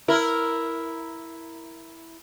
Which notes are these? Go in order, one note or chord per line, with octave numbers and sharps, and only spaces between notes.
E4 A#4